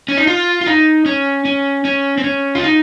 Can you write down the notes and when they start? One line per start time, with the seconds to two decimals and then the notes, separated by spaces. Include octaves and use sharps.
0.08 C#4
0.17 D#4
0.27 F4
0.61 F4
0.66 D#4
1.06 C#4
1.45 C#4
1.85 C#4
2.18 C4
2.24 C#4
2.55 F4
2.64 D#4